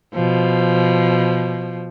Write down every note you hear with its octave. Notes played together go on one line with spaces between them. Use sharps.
B2 F3